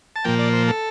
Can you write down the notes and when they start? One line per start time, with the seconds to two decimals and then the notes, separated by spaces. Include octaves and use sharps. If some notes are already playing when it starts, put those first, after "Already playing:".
0.16 A5
0.24 A#2 F3 A#3 G5
0.39 D5
0.53 C5
0.68 A4